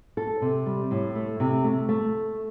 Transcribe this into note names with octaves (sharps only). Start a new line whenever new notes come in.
A4
C3
G3
A2
A3
C3
A3
A3